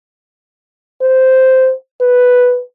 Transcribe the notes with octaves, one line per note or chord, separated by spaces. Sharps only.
C5
B4